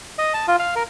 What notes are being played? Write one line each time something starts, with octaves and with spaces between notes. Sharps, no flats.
D#5
A5
F4
F5
A#4